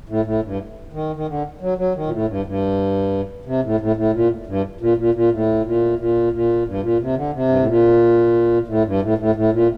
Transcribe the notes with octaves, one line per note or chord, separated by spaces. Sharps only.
A2
A2
G2
D#3
D#3
D3
F#3
F#3
D#3
A#2
A2
G2
G2
C3
A2
A2
A2
A#2
G2
A#2
A#2
A#2
A2
A#2
A#2
A#2
G2
A#2
C3
D3
C3
G2
A2
A#2
A2
G2
A2
A2
A2
A#2